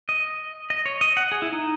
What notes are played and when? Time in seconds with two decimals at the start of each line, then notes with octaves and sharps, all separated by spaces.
0.09 D#5
0.70 D#5
0.86 C#5
1.01 D#5
1.17 F#5
1.32 G#4
1.42 E4
1.53 D#4